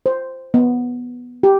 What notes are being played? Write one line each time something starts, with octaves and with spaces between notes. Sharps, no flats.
C5
B3
G4